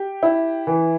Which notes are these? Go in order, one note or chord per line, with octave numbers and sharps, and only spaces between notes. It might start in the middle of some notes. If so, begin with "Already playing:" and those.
Already playing: G4
E4
E3